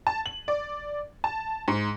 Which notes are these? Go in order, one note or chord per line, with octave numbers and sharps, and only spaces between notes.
A5
F#7
D5
A5
G#2